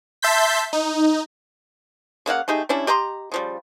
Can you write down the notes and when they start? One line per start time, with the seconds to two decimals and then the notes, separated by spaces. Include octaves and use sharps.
0.22 E5 A5 C6 G6 B6
0.73 D#4
2.26 C#3 A#3 F5 F#5
2.48 A3 D#4 G4 G#4
2.69 G3 C#4 D4 E4
2.87 G4 D#5 A#5 C6
3.32 C#3 F3 G3